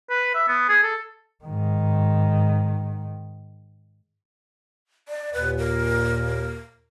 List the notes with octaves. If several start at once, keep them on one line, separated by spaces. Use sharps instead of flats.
B4
E5
B3
G#4
A4
G#2 D#3
D5
D#2 A#2 B4
A#4